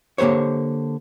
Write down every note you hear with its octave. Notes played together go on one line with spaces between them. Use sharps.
D3 A#3 G4 C5 C#5